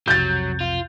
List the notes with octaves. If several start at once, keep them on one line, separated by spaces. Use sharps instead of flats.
B1 F2 C3 F#3 G6 A6
F4